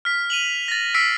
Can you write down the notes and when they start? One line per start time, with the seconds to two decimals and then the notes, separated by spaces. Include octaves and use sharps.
0.05 F6 B6
0.30 D#7 F7 F#7
0.68 A6 A#6
0.94 E6 B6 C7 D7 F#7